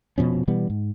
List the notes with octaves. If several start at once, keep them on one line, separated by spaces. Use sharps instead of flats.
F1 B2 F3 C#4
B2 E3 G3 B3
G#2